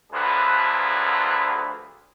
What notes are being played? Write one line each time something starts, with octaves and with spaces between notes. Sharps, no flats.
D2 D3 F3 F#3 G#4 B4